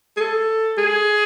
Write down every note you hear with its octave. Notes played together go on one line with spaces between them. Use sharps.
G#4
A4
G#4